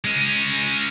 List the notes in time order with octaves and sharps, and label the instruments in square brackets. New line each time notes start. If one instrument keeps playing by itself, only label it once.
[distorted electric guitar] G#3 C#4